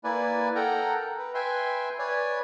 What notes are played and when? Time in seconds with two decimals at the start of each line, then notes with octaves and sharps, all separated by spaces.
0.04 A#3 E4 B4 D5 G#5
0.55 A4 A#4 F#5 G5 A#5
1.18 B4
1.34 B4 E5 G5 G#5 C6
1.99 B4 C#5 D5 G#5